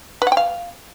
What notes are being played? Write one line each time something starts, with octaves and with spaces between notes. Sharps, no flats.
B4
F#5
G5
F5